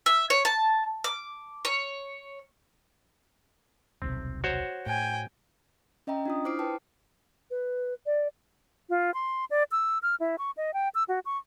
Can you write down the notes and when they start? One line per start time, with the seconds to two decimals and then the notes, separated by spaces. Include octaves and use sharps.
0.06 E5
0.30 C#5
0.45 A5
1.04 D6
1.65 C#5
4.02 D#1 B1 C3 C4
4.44 F#4 C5 C#5
4.86 A2 G5 G#5
6.07 C#4 D#5 E5 G5 A#5
6.26 D4 F4 D#6
6.45 E4 C5 D6 F6 C7 D7
6.59 B4 G5 A5
7.50 B4
8.05 D5
8.90 F4
9.14 C6
9.51 D5
9.72 E6
10.02 F6
10.20 E4
10.39 C#6
10.57 D#5
10.74 G5
10.95 E6
11.08 F#4
11.25 C#6